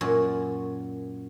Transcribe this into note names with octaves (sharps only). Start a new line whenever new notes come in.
F#2 A#2 C#5